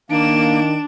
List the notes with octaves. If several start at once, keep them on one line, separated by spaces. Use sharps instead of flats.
D#3 A#3 D4 D7 E7